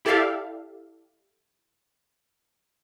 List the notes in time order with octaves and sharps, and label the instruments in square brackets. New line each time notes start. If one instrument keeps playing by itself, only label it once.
[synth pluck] E4 G4 A4 D5 E5 F5